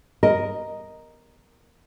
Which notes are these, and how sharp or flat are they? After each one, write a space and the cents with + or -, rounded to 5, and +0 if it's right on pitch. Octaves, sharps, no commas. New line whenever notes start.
A#4 +0 D#5 +0